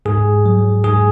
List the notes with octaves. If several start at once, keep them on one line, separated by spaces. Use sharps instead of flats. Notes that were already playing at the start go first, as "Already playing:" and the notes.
G#2 G#4
F#3
G#2 G#4